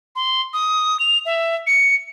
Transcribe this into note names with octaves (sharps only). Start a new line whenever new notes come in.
C6
D#6
F7
E5
C#7